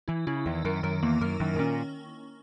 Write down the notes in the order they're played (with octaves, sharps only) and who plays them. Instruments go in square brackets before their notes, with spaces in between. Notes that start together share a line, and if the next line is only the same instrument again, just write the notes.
[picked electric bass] E3 [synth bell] E4
[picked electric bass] C#3 [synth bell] E4
[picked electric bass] E2 [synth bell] D#3
[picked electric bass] F#2 [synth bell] A#4
[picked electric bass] F#2 [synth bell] A#4
[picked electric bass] E2 [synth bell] A#3
[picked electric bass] F#2 [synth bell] A#4
[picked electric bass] F#2 [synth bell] D#3
[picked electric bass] G#2
[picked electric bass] A#2 [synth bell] C#4